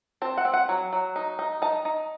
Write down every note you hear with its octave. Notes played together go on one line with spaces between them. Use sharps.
C4 A5
F#5
C4
F#5
F#3
F#3
D#4
D#4
D#4 A5
D#4